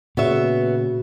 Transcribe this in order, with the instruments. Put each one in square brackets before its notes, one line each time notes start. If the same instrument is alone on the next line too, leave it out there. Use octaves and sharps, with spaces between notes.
[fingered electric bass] A#2 [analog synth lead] C#3 [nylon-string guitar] B3 C#5 E5 [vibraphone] F#4